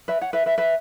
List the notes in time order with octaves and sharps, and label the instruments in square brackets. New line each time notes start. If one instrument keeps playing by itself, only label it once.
[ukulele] B4 E5
C#5 F#5
B4 E5
B4 E5
B4 E5